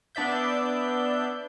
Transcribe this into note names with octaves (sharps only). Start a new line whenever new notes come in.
B3 D4 D5 E5 G6